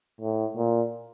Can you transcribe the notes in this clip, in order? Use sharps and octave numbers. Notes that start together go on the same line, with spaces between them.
A2
A#2